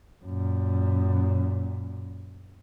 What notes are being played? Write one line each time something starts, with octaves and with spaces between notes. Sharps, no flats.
F#2 A#2